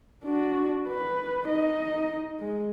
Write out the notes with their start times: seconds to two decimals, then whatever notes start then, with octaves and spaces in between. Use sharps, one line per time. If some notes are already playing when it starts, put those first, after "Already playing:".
0.24 D4 F#4
0.89 B4
1.45 D#4 D#5
2.39 G#3